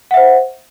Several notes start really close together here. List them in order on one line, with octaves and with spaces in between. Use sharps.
F#5 E5 C5